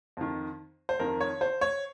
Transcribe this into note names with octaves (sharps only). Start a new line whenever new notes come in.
F2 D#3
C5
F2 D#3 A#4
C#5
C5
C#5